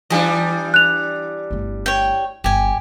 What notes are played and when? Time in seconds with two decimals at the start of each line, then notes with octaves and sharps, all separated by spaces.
0.10 E3 G3 D4 G#4 D#5
0.74 F#6 F7
1.51 G1 A3
1.86 C#5 G5
2.44 G1 G4 G#5